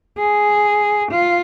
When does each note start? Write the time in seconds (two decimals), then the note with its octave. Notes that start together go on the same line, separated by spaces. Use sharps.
0.19 G#4
1.12 F4